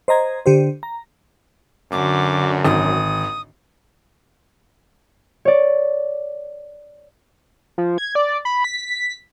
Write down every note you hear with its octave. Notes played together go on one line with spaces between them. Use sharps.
C5 D#5 A#5 G#6
D3 G4 C5
A#5
F#2 D3 D4 F#4 D6
G#1 D#6
C#5 D5
F3
G#6
D5
B5
B6